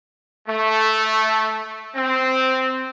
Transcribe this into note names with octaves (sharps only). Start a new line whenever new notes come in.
A3
C4